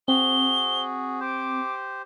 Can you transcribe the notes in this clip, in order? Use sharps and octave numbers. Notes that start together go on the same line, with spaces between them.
C4 F#4 G#4 G7
G4 C5 D6